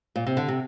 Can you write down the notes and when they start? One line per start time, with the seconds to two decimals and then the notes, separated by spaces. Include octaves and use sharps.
0.16 A#2
0.27 C3
0.37 D3
0.48 C3